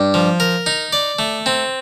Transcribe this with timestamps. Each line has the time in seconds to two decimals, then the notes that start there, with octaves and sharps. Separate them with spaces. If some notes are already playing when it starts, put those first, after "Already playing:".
Already playing: G2
0.14 F3
0.40 A#4
0.66 D#4
0.93 D5
1.19 A3
1.46 C4